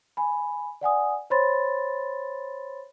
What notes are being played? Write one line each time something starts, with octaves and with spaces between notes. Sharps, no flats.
G#5 B5
D5 F#5 G#5 D#6
C5 C#5 B5 C6 A6